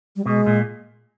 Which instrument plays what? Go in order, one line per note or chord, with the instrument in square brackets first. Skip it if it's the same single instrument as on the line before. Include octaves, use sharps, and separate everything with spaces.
[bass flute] G3
[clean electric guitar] B2 [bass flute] G#3
[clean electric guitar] A#2